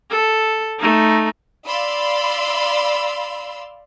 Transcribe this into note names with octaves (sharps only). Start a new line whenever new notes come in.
A4
A3 D#4
D5 F5 B5 C6 E6